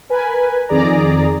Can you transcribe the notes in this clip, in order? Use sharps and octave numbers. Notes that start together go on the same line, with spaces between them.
A#4 B4 G#5
F2 D#3 G#4 D5 A#5